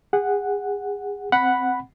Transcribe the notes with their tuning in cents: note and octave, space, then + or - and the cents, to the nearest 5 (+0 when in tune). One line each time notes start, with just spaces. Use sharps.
G#4 -30 F#5 +0
C4 +0 F#5 +0 B5 +0